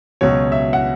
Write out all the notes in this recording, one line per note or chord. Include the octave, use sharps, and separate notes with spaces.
C#2 B2 F#3 C#5
E5
F#5